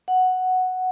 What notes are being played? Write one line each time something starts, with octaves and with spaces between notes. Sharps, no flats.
F#5